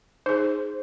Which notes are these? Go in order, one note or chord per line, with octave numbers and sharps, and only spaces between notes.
D#4 G#4 C5